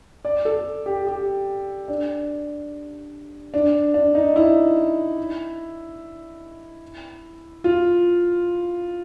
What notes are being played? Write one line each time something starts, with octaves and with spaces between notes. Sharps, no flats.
D5
A4
G4
G4
D4
D4
D4
D#4
E4
F4